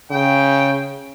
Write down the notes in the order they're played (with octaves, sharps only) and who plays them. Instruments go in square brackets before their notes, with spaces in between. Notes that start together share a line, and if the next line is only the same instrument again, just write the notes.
[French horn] C#3 [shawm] G5